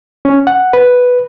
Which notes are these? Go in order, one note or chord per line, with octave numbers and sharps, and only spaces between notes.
C#4
F#5
B4